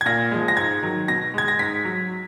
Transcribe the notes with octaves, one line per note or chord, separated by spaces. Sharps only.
G#6
A#2 A#6
F3 G#3
A#6
G#2 G#6
D#3 F#3
B2 A#6
G#3 G#6
A#6
G#2 B6
F#3